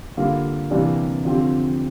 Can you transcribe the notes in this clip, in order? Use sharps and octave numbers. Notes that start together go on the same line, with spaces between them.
D3 G3 A#3 F4
C3 E3 G3 A#3 D4
D3 F3 C4 G4